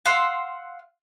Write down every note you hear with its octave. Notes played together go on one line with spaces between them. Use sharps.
F5 F#5 C6 E6